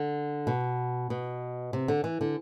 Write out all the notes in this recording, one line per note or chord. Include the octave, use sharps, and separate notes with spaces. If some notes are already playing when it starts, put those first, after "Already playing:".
Already playing: D3
B2
B2
C3
D3
E3
D3